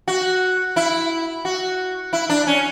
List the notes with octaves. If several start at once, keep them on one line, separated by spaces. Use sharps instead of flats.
F#4
E4
F#4
E4
D4
C#4